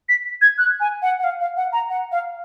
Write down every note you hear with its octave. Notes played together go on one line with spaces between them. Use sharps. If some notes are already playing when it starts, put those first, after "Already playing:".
B6
G#6
F#6
G#5
F#5
F#5
F5
F5
F#5
A#5
F#5
F5